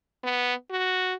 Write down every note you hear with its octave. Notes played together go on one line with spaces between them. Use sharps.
B3
F#4